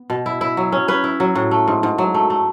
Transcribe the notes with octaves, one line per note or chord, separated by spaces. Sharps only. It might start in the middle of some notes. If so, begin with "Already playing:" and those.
Already playing: B3
B2
E4
E4
F#3
C#4
C#4 B4
E4
F#3
A2
A3
G#2
G#2
F#3
A3
A3